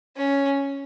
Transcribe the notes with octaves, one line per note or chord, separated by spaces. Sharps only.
C#4